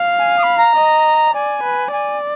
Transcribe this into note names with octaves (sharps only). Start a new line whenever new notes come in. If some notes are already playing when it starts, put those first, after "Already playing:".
Already playing: F5
G#5
D#6
B5
A#5
D#5
D5 G#5
B4
D5 G#5